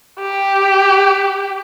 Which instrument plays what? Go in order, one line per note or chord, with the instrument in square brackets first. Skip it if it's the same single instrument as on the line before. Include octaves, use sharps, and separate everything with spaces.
[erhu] G4